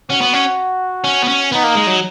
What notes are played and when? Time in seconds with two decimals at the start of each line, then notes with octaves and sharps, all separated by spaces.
0.10 C#4 F#4
0.22 B3
0.34 C#4
1.04 C#4
1.23 B3
1.28 C#4
1.52 B3 D#4
1.64 A#3
1.75 G#3
1.87 F#3